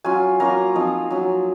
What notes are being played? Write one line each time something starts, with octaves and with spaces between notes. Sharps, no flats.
F#3 C#4 F4 G#5
F#3 A#3 C#4 F4 A#5
F3 C4 D#4
F#3 C#4 F4